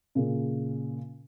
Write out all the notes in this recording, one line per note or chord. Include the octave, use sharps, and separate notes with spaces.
A#2 C#3